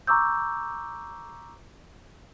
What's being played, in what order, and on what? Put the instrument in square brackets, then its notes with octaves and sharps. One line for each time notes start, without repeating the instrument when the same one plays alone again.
[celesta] A#5 C#6 D6 E6 G6